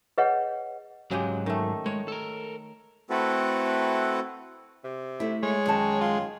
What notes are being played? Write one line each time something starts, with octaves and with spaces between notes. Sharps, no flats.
G#4 B4 C#5 D#5 F#5
G#2 C#3 F#3 G#3 G4
D#3 A3
G#3 C#5
A4 A#4
A3 C4 E4 F#4 A4 B4
C3
A3 E4
G#3 C#5
F#2 D#3 A5
F4